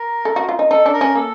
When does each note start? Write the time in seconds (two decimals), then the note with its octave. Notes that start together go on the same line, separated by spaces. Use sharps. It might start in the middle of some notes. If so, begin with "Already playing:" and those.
Already playing: A#4
0.25 A4
0.36 F#4
0.49 F4
0.59 D#4
0.70 D#4 A4
0.86 D4
0.93 A#4
1.01 C#4
1.15 A#3 A4